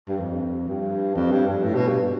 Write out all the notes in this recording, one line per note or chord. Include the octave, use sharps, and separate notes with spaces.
G2
F2
G2
F2
G2
G2
A2
B2
G2